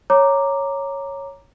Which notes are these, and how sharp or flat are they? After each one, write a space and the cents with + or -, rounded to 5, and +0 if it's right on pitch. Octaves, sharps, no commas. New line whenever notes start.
C#5 -5 A#5 +0 D6 +0